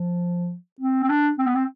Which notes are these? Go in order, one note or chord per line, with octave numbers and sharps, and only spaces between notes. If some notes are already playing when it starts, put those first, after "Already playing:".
Already playing: F3
C4
C4
D4
C4
B3
C4